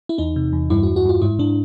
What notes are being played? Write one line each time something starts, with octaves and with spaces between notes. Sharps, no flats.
E4
E2 D#4
C3
E2
G2 E4
F#4
G2
F#4
G2 F4
G#2 E4
G#2 D4